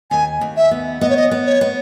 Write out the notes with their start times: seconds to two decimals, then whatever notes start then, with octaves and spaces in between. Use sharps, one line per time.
0.11 D#2 G#5
0.41 D#2
0.57 E5
0.71 B3
1.01 B3 D#5
1.10 C#5
1.17 D#5
1.31 B3
1.46 C#5
1.61 B3